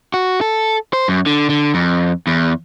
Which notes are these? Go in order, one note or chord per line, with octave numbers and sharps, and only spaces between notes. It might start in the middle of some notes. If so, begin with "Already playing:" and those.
F#4
A4
C5
F#2
D3
D3
F2
E2